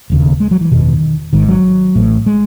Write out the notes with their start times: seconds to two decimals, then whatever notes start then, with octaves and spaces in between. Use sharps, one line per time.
0.10 E1 D#2 C#3
0.40 G#3
0.51 F#3
0.61 E3
0.71 F#1 E2 B2 D#3
1.33 G#1 G#2 D#3
1.48 F#3
1.95 A1 A2
2.26 G#3